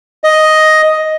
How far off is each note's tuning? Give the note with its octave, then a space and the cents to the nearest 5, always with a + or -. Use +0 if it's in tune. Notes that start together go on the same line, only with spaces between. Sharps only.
D#5 +5